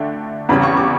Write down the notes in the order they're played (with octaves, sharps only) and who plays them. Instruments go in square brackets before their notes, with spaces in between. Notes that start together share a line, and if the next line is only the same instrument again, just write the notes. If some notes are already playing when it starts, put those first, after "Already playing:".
Already playing: [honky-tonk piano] D3 A3 D4 G5
E2 C#3 G3 C#4 B5
C#6
D6